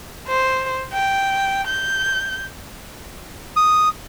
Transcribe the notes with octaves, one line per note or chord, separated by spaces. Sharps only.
C5
G5
G6
D#6